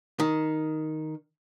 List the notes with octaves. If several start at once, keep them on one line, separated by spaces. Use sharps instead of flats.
D#3